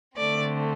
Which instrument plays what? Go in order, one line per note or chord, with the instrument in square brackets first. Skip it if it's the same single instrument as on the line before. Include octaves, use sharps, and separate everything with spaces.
[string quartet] D3 A3 C4 D5